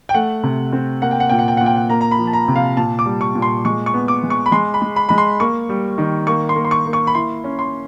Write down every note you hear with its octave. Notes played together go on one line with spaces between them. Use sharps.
G5
A3 F#5
C3
C4
A#3 F#5
G5
F#5
A#2 G5
F#5
G5
A#2 F#5
G5
F#5
A#3 A#5
A#5
B5
F3
A5
A#5
C3
F5
A#2 A5
D6
G3
C#6
A#2
C6
G#3 C#6
C#6
B3
D6
G#3
C#6
B5
G#3 C6
B5
G#3
B5
G#3 B5
C6
A#3 C#6
G3
D#3
A#3 C#6
C6
A#3
C6
C#6
A#3
C#6
B5
E4 C6
C#4
C6